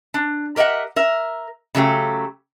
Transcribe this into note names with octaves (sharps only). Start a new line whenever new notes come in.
D4
G4 A#4 D#5 E5 F#5
A#4 E5
C#3 F#3 A3 G4